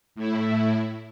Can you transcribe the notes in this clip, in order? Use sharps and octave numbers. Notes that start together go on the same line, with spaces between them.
A2 E4